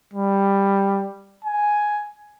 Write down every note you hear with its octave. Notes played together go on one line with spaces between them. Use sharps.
G3
G#5